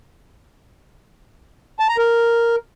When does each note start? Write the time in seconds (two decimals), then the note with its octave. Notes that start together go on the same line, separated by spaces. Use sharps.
1.80 A5
1.89 A#5
1.98 A#4